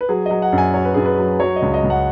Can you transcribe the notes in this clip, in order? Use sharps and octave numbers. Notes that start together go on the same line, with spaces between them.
B4
F#3 G#4
F#3 D#5
F#5
F#2
G#5
F#3 C#5
B4
F#2 G#4
B4
F#3
F#3 C#5
D#5
C#2
D#5
C#2
F#5